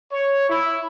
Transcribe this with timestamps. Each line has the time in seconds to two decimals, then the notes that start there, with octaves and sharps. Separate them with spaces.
0.11 C#5
0.48 E4